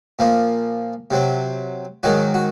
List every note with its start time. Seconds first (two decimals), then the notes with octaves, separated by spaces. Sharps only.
0.19 A#2 F3 A#3
1.11 C3 F#3 C4
2.03 G#2 D#3 F#3 F#4
2.34 F#4